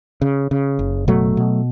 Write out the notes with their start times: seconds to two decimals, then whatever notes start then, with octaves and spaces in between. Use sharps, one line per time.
0.22 C#3
0.51 C#3
0.79 F#1
1.08 B2 F#3 A3
1.37 B2